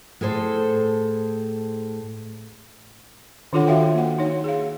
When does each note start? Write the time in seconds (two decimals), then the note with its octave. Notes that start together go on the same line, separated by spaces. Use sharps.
0.21 A2 G#4 A4 C5
3.53 D#3 D4 F4 A4 C#5 F#5
3.67 F#4 E5 F5 G5
3.94 A#3 F#5
4.19 D#4 C#5
4.44 G#4 F5